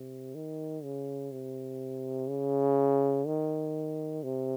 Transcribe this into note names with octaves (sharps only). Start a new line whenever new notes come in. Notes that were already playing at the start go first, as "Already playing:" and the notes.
Already playing: C3
D#3
C#3
C3
C#3
D#3
C3